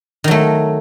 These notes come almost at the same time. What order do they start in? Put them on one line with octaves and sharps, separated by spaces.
D#3 F#3 A3